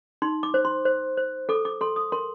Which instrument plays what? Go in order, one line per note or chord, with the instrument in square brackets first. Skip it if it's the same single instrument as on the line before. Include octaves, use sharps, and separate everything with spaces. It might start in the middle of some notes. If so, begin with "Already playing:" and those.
[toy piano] D#4 C6
D6
C5
C6
C5
C5
A4 D6
D6
A4 C6
D#6
A#4 C6